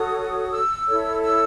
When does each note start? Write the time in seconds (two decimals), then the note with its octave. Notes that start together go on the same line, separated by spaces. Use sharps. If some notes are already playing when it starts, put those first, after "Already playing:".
Already playing: F#4 A4 C#5 D#6
0.52 E6
0.88 E4 A4 C#5
1.23 E6